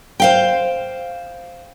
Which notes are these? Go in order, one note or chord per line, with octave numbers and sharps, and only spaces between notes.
C5 F5 G5